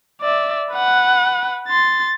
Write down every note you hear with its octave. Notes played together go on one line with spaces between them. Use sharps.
D5 E5
B4 F#5
C6 A6